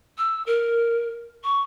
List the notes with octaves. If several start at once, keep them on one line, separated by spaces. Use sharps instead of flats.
E6
A#4
C#6